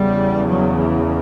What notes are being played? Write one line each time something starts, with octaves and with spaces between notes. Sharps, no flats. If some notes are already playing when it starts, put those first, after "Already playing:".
Already playing: E2 C#3 G3
F#3
E3